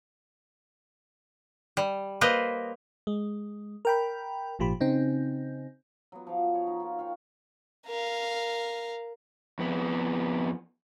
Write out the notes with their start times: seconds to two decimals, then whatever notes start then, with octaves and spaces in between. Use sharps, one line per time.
1.77 G3
2.21 A#3 B4 C5 D#5
3.07 G#3
3.85 A#4 G5 B5
4.59 G#1 A#2 F3 G4 B5
4.80 C#3 C4 D#4
6.12 F#3 B3
6.27 F3 F5
6.55 C#5
6.67 D#4
6.80 F4 A#4
6.99 F5 G5 C#6
7.87 A#4 F5
9.59 F2 B3